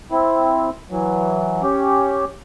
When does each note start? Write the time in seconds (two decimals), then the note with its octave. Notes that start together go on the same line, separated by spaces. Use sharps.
0.12 C4 E4
0.91 E3 F#3
1.63 C#4 G4